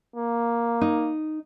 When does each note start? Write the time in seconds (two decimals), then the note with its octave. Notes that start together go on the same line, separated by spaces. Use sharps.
0.16 A#3
0.81 D#4